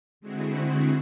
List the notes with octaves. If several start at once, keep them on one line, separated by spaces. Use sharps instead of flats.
D3 G#3 C4 E4 F#4